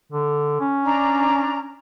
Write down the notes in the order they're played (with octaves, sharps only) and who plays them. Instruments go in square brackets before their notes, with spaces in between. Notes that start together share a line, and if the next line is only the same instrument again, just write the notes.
[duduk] D3
C#4
[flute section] D4 A#5